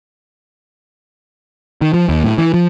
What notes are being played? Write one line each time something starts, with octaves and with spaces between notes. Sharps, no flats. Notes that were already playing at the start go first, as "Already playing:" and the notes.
D#3
F3
D#2
A2
E3
F3